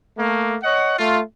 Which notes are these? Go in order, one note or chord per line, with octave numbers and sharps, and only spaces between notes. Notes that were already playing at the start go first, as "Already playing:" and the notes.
A3 A#3
C#5 D#5 F#5
A3 F4